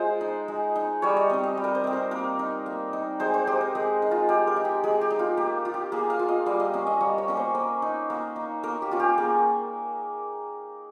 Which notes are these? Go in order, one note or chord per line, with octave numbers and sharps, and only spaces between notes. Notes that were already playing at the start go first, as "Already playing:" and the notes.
Already playing: G#3 F4 C5
D#4
G#3
D#4
G3 C#5
D#5
C4 D#4 D#5
D#5
G3
A#4
C5
C4 D#4
A#4
A#3 A#4
D#4
A#3
D#4
G#3 C5
C5
D#4 G4
A#4
G#3 G#4
D#4
F4
G#3 G4
A#4
D#4
G4
G#3 G#4
G4
D#4
F4
A#3 G4
F4
G4
A#3 G#4
F5
F4
D#5
G3 F5
D#5
A#3 C#4 D#5
D#5
G3 C#5
C#5
A#3 C#4
C5
A#3
D#4
A#3
D#4
A#3 A#4
G4
C#4 F4
G4
A#3 G#4